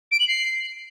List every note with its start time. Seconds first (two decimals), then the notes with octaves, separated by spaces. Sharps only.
0.12 D7
0.20 F#7
0.28 C7